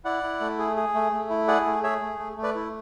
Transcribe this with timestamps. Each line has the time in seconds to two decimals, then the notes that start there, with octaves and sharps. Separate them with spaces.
0.05 E4 D5 F#5
0.23 E4
0.40 A3
0.59 G#4
0.76 G#4
0.94 A3
1.12 A3
1.30 E4
1.48 G#4 D5 F#5
1.66 A3
1.83 G#4 C#5 E5
2.01 A3
2.19 A3
2.37 A3
2.43 B4 D5
2.55 E4